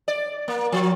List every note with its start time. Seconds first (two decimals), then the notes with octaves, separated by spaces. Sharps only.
0.08 D5
0.48 A#3
0.72 F3